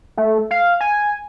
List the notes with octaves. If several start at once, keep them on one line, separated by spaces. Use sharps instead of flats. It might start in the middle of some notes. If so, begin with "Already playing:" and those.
A3
F5
G#5